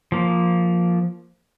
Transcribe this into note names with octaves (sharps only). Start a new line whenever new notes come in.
F3 A#3